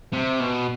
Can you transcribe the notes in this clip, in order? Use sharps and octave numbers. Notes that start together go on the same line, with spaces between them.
C3
B2